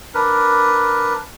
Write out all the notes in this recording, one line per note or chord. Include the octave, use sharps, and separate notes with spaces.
D4 A#4 B4